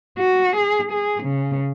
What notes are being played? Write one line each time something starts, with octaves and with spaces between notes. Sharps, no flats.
F#4
G#4
G#4
C#3